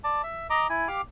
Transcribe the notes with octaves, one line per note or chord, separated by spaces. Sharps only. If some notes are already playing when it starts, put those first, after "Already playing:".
D5 A5
E5
D#5 A#5 D6
E4 G#5
G4 F5 D6